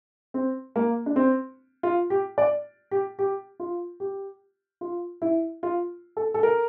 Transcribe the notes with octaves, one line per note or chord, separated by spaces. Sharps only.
C4
A#3
D4
C4
F4
G4
D5
G4
G4
F4
G4
F4
E4
F4
A4
A4
A#4